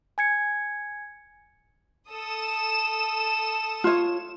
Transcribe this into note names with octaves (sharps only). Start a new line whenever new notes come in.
G#5 G#6 C#7
A4 D#6 E7
F4 C#5